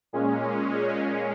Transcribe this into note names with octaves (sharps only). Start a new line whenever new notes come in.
A#2 G#3 C#4